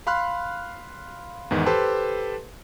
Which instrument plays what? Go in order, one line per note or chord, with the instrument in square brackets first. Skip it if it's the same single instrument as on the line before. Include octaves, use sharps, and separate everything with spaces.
[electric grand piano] F5 B5 C6 F6 F#6
E2 G#2 D#3 E3
G4 A4 B4 C5 A5 C6